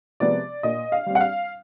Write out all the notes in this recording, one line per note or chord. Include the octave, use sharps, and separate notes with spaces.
C3 F3 G#3 B3 D5
A#2 D#5
F5
G3 C4
F#5
F5